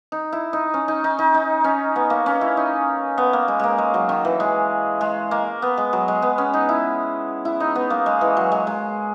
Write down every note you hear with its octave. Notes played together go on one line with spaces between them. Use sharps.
D#4
E4
D#4
C#4
D#4
D#4
D#4
D#4
C#4
B3
A#3
C#4
E4
D#4
B3
A#3
G#3
G#3 A#3
G#3
F#3
D#3
E3
G#3
G#3
A#3
B3
G#3
F#3
G#3
B3
C#4
D#4
E4
E4
D#4
B3
A#3
G#3
E3
F#3
G#3
G#3